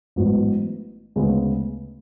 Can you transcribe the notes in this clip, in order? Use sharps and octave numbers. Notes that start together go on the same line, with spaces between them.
A1 G#2 F#3 B3
D2 C#3 G#3 B3